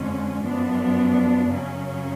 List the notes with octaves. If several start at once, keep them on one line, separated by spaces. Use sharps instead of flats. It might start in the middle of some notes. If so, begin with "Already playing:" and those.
Already playing: F2 D3 G#3 C#4
F#2 F3 B3 D4
F#2 C#3 F#3 C#4